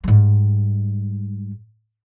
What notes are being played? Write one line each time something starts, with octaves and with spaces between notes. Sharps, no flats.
G#2 G3